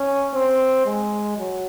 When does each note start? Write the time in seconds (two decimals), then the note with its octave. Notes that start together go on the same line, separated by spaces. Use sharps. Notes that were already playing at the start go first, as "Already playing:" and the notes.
Already playing: C#4
0.33 C4
0.86 G#3
1.38 F#3